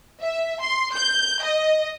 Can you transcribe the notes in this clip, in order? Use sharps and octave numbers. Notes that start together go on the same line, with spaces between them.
E5
C6
G6
D#5